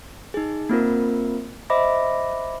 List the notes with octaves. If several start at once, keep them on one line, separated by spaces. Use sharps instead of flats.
D#4 G#4
A#3 C4 F4 A#4
C5 D#5 E5 B5 D6 A#6